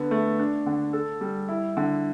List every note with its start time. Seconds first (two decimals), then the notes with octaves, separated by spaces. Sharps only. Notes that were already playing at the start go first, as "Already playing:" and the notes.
Already playing: D3 B3
0.11 A3
0.39 D4
0.66 D3
0.93 A4
1.21 G3
1.49 E4
1.77 D3